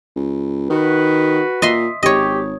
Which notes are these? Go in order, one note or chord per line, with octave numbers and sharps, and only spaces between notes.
C#2
D#3 F#4 B4
A#2 D#5 E5 C6
G#1 G4 C#5 D#5